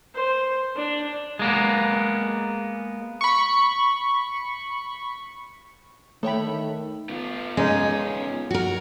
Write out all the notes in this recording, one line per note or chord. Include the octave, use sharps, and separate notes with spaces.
C5
D4
G#3 A#3 B3
B5 C#6
D#3 A3 A4 C#5 G5 B5
B3 F4
G#3 C#4 D#4
F#4 A#4